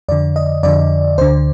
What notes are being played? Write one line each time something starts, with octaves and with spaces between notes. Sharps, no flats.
F2 D3 D5
D#5
F2 D3 D5
D2 D3 C5